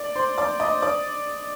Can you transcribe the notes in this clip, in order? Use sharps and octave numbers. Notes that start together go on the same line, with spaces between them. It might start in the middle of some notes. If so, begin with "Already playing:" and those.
Already playing: D5 D6
C5 C6
D5 D6
D#5 D#6
D5 D6